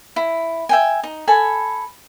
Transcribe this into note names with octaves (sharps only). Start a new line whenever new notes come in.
E4
E5 G5 G#5
D#4
A4 G#5 B5